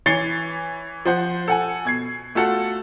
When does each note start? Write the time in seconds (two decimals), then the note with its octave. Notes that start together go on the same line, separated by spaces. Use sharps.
0.06 E3 C#5 A6 C7 C#7 G7
1.05 F3 C5 F#5
1.48 A4 F#5 G#5
1.85 B2 G#6 C7
2.35 A3 F4 F#4 A4 F#5